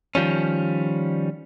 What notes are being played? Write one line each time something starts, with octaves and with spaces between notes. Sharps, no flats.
D#3 F3 G3 C#4